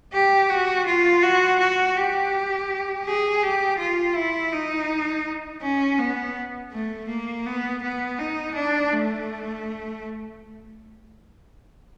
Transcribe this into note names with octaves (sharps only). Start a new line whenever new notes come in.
G4
F#4
F4
F#4
F#4
G4
G#4
G4
F4
E4
D#4
C#4
B3
A3
A#3
B3
B3
D#4
D4
A3